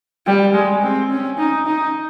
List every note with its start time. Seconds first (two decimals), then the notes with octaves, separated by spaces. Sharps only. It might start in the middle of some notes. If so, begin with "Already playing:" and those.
0.26 G3
0.55 G#3
0.82 C4
1.11 C#4
1.39 D#4
1.66 D#4